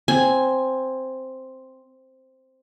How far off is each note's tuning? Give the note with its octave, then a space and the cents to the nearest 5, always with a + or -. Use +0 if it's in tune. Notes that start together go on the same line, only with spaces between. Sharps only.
C4 +0 G#5 +0